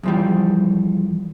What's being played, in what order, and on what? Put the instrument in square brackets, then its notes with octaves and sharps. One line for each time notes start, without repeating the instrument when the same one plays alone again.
[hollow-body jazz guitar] E2 F3 G3